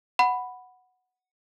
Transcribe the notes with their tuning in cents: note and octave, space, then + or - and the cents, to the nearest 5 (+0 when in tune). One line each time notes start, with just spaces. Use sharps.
F#5 +0 B5 +0